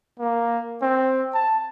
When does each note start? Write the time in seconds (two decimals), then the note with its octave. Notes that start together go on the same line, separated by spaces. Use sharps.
0.20 A#3
0.82 C4
1.34 A5